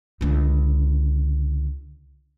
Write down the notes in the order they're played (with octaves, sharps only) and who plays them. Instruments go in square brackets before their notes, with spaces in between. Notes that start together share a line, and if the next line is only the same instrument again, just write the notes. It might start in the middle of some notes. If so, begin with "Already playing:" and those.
[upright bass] C#2 D3